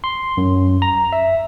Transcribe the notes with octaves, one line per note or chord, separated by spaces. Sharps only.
C6
F#2
A#5
E5